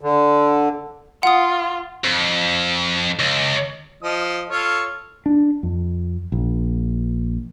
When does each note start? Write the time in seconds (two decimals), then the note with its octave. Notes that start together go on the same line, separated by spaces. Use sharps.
0.01 D3
1.23 F4 F#5 D#6
2.05 F2
3.19 C#2
4.03 F3 D#5 D#6
4.49 F4 A4 C#5
5.26 D4
5.63 F2
6.32 A#1